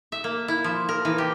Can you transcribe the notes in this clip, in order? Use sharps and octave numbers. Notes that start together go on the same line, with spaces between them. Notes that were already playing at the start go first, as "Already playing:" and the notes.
E5
A#3
E4
F3
A#4
E3
G4